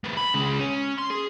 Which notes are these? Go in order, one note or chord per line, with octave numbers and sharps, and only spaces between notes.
A3 B3
B5
C#3 G#3
C#4
C6
G#4